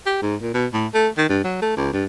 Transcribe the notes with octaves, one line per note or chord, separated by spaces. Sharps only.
G4
G#2
A#2
B2
A2
A3
D#3
G2
F#3
A3
C#2
G2